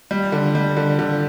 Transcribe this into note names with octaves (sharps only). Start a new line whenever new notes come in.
G3
D3
G3
D3
D3